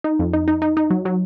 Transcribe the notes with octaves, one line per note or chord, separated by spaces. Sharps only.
D#4
F2
D#4
D#4
D#4
D#4
F#3
F#3